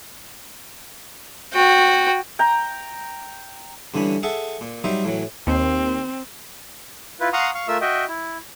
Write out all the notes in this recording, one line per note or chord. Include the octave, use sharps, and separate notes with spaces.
F#4 G5
G5 A#5
G2 D3 E3 C#4 B5
G#4 A4 E5 F#5
A#2
F#3 G3 D#4 C5 E5
A2 E3 F#3
D#2 C4
E4 F4 B4
F5 F#5 A#5 C6 C#6 D#6
F5 C#6
A3 F4 A#4 E5 E6
F#4 D#5 E5 G5
E4